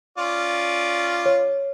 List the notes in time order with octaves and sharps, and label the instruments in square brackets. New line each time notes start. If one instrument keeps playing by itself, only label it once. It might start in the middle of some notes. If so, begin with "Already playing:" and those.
[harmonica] C#4 F4 D5
[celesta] C#5